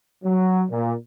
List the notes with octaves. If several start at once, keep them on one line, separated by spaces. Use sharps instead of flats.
F#3
A#2